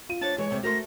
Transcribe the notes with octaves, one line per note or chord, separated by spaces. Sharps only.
F4 D#7
D4 C5 C#5 A6
E3 G#3 C#5
D2 C3 C5
A3 F#4 A#4 C5 C6 A#6